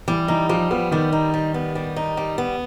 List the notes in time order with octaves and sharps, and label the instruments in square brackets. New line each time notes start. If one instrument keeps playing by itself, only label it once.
[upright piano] E3 [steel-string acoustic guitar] G3
[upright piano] E3 [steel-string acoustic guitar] D#4
[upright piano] F3 [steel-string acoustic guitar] G3
[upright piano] F3 [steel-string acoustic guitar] B3
[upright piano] D#3 [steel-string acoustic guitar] G3
[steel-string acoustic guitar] D#4
G3
B3
G3
D#4
G3
B3